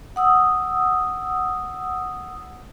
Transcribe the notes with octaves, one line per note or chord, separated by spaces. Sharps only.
F#5 D#6 E6